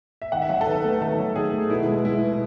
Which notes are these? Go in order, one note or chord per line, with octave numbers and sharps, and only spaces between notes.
E5
D#3 F#5
E5
F#3 F#5
A4
D#3 B4
A3 B4
D#3 A4
F#3
D#3 G#4
A3
B2 E4
G#3
G#3 E4
B2